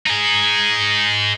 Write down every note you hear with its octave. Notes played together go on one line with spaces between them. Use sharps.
D#4 G#4